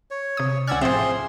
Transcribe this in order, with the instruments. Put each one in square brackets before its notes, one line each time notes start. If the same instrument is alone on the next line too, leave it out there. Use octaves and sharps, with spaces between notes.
[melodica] C#5
[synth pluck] C3 D#6
[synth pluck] C#2 F6 [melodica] C#4 D5 [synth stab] F#5 E6 G#6
[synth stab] A1 F3 C4 [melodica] G#4 C6 [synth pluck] C5 E5